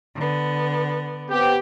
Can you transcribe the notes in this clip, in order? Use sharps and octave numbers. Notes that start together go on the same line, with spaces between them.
D3 B3
B3 C4 G4